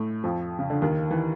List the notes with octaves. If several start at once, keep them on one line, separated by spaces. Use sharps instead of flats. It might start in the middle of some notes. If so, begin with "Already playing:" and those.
Already playing: A2 A3
F2 F3
C#3
D3
D#2 D#3
E3